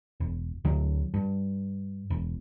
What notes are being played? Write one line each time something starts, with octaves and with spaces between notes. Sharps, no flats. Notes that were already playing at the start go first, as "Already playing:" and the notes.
E1
D2 D3 F#3
G2
E1